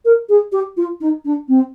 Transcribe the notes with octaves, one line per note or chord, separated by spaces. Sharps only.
A#4
G#4
G4
F4
D#4
D4
C4